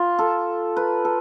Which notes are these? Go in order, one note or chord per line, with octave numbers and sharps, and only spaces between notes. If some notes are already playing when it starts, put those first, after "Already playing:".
Already playing: F4
A4
B4
A4